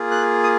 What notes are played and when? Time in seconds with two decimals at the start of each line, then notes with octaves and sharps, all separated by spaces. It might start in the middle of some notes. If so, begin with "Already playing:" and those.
Already playing: A#3 F4 G#4
0.11 F#6
0.43 D#6